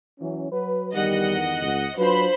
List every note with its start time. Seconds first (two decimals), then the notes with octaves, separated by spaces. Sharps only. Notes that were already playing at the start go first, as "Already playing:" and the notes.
0.20 E3 F#3 C#4
0.51 F#3 B4
0.94 E2 G2 D#3 G3 D#5 F#5
1.62 C#2
1.98 F#3 D4 F4 B4 C5 B5